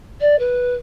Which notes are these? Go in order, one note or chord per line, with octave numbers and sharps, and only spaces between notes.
D5
B4